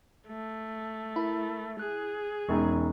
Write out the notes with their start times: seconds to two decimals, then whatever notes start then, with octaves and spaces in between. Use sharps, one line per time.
0.28 A3
1.16 E4 A#4 B5
1.79 G#4 F#6
2.49 E1 E2 C#4 D#4 C#6